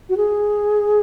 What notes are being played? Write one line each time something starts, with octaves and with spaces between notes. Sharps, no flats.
F#4
G#4